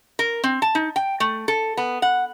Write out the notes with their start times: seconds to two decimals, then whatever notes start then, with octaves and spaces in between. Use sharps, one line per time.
0.19 A#4
0.44 C4
0.62 A5
0.75 D#4
0.96 G5
1.20 A3
1.48 A4
1.77 B3
2.02 F#5